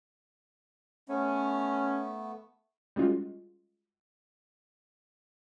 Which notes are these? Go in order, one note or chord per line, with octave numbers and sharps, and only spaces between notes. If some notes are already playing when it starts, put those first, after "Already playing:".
A3 B3 C#4
G3 G#3 C#4 F4 F#4